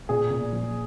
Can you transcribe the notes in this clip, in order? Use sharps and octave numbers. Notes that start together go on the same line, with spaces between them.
A#2 G#4
A#2
F3